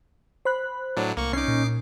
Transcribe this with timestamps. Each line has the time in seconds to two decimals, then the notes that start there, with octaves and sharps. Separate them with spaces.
0.45 C5 B5 F#6
0.97 A2 F#3 D4
1.17 C2 A#3 C#6
1.33 C#4 D#4 D6 C7
1.48 A#2